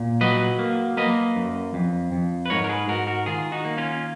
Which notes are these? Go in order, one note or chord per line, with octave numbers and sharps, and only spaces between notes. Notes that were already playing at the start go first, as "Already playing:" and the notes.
Already playing: A#2
F#3 B4 D#5
A#3
A#3 B4 D#5
F#2
F2
F2
B4
G#2 A#4 C#5
A#4
G#4 B4
G#2 F#4 A#4
F#4 A#4
D#3 F4 G#4
D#4 F#4
A#3
C#4 F4